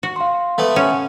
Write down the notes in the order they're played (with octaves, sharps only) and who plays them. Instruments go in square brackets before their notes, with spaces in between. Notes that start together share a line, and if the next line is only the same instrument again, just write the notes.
[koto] F#4
[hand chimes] F5 C6
[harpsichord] A3 B3
[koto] C#4 [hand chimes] F#5